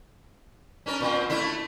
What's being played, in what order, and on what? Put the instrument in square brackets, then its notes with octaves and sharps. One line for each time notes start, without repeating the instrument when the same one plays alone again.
[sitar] C#4 D4 A#4
A#2 C4
A3 D4 E4